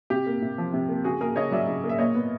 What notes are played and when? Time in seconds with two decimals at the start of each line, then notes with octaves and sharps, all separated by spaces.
0.10 C3 G4
0.27 A#3
0.42 C3
0.58 F3
0.74 C3
0.89 A#3
1.04 C#3 F#4 G#4
1.21 A#3 G#4 A#4
1.36 C#3 C#5 D#5
1.52 F#3 D5 E5
1.68 C#3
1.84 A#3
1.89 E5
1.98 A#2 C#5 D#5
2.15 B3